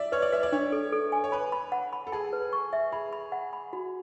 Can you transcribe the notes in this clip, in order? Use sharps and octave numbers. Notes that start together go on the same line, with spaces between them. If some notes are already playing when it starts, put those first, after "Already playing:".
Already playing: D5 E5
B4 C#5
D5
B4 E5
D5
D4 C#5
A4
A4
G#5
C#5
B4 B5
B5
F#5
B5
A4
G#4 A5
B4
C#6
E5
G#4 B5
B5
F#5
B5
F#4